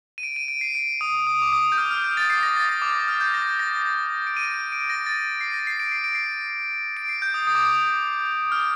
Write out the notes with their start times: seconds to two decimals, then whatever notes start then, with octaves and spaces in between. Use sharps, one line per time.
0.18 D#7
0.23 D7
0.36 D#7
0.48 D7
0.61 C7
0.75 D7
1.01 D#6
1.27 D#6
1.42 D6
1.53 D#6
1.72 G6
1.78 F6
1.91 F6
2.04 G6
2.17 A6
2.30 C7
2.43 A#6
2.57 A6
2.69 D#6
2.82 D6
2.95 D#6
3.08 F6
3.21 G6
3.34 A#6
3.59 A#6
4.27 D7
4.37 D#7
4.54 D#7
4.72 D7
4.90 A#6
5.06 A6
5.41 C7
5.54 A#6
5.67 C7
5.80 D7
5.92 C7
6.04 D7
6.15 C7
6.97 D7
7.09 C7
7.22 G6
7.34 D#6
7.47 D#6
7.55 D6
7.63 D#6
8.52 F6